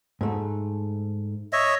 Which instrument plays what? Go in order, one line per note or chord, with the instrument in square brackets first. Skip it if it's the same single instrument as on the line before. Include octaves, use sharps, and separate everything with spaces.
[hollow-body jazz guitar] G#2 A3
[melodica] C#5 D#5 E5